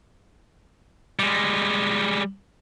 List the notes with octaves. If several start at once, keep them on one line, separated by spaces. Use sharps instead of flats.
G3 G#3